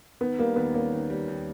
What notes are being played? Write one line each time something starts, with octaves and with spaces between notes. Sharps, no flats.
D#3 B3
G3 A#3
D#2 B3
A#3 C#4
D#3
G3
D#2